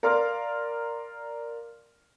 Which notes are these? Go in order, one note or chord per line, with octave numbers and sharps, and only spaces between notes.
A#4 D5 F5 C6 F6